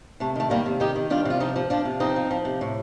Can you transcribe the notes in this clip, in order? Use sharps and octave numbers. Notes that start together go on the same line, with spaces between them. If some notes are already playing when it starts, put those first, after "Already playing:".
C3 A3
D#3 A3
D#3 G3 A#3
C3
D#3 D#4 G4
D#3
G3 D4 F4
C3 F4
F3 D#4 G4
F3
F3 D4 F4
C3
F3 C4 D#4
F3
F3
C3
A2